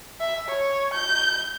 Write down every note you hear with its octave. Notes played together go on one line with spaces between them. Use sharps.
E5
C#5
G6